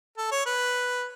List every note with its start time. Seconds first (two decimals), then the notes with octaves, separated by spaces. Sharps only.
0.17 A4
0.31 C#5
0.46 B4